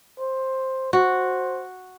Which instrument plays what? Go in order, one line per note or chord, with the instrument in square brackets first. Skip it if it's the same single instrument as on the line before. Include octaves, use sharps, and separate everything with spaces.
[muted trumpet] C5
[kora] F#4 [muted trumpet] C5